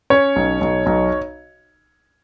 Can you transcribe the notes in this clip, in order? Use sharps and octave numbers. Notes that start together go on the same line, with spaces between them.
C#4 C#5
B1
B1
B1